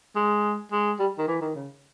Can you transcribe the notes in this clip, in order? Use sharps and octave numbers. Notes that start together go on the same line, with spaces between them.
G#3
G#3
G3
D#3
E3
D#3
C#3